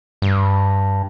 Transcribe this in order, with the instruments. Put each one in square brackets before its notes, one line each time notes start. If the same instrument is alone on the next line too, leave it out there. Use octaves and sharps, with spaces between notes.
[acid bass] G2